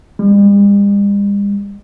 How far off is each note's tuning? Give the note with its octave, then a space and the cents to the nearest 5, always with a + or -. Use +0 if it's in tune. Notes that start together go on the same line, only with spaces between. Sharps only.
G3 +45